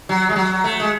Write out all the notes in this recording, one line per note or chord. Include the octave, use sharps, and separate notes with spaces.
F#3
G#3
F#3
A3
G#3